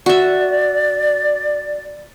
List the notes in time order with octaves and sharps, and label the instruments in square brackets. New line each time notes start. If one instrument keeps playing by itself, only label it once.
[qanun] F#4 E5 [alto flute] D5